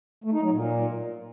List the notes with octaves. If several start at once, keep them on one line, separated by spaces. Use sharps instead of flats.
A3
D#4
F#3
A#2